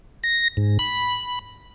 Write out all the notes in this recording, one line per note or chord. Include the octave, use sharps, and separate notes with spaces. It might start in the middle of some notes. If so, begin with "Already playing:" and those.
A#6
G#2
B5